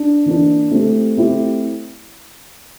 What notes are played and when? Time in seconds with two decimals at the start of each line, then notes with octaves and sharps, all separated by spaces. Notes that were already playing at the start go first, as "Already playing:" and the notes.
Already playing: D4
0.26 E3 A#3 D4
0.71 A3 C4 E4 G4
1.17 A3 C4 E4 G4